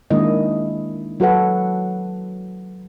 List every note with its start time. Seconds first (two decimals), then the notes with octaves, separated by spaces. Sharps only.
0.11 D#3 G#3 A#3 D4 E4 D#5
1.20 F#3 F#4 A4 B4 F#5